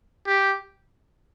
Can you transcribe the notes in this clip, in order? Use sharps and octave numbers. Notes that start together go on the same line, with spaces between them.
G4